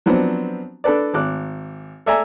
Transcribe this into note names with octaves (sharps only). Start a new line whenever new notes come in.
F3 F#3 B3 C4 D4
D4 A4 B4 D5
G#1 D6 F#6
A4 D5 E5 G#5 A#5